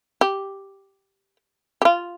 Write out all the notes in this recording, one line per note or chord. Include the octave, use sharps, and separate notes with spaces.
G4
G4
F4